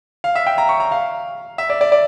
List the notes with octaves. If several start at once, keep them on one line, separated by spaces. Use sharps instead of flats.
F5
E5
G5
A#5
C#6
A#5
F5
E5
D5
D5
D5